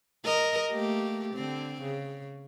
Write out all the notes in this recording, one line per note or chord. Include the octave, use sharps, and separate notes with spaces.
A#4 D#5
A3 A#3 G4
D3 C4
C#3